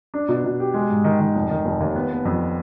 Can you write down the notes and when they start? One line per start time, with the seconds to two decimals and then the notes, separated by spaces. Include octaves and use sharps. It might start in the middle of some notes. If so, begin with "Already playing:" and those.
0.14 D4
0.29 B2
0.44 B2
0.60 G4
0.74 G#3
0.89 G#2
1.04 D#3
1.20 D#3
1.35 F1
1.50 D#3
1.65 F1
1.80 D#2
1.96 B3
2.10 B3
2.25 F2